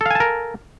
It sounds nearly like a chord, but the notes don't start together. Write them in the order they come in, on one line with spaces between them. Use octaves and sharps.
A4 F5 G#5 A5 A#4